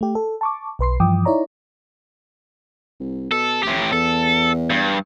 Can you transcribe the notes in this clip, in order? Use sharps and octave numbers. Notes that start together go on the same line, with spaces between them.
A3 G4
A4
A5 C#6 D6
B1 B4 C6 C7
G2 E3 F3 G5 D6 D#6
D#4 E4 C#5 D5 A#5
C2
B2 A4
F1 A2 G4
E2 A4
G2